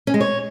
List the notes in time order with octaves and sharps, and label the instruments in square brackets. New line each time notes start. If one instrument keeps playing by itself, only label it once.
[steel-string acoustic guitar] C#4
G#3
C#5